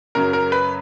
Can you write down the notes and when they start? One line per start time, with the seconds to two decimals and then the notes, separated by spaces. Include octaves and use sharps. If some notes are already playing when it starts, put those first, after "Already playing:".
0.15 F#2 C#3 F#3 A#4
0.33 A#4
0.52 B4